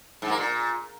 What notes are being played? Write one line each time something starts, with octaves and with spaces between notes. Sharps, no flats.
G#2
A#3
A#2